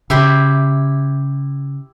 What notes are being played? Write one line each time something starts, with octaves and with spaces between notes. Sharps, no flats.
C#3 E4 G4 C6